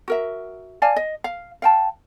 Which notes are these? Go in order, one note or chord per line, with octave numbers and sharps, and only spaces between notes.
F#4 A#4 E5
D5 F5 G#5 A5
D#5
F5
F5 G5 A5